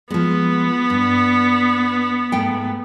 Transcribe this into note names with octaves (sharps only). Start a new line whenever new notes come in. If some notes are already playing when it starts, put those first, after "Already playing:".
F3 G#3 B3
G2
G#2 A3 G5